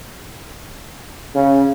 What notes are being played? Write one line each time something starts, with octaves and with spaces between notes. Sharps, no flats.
C#3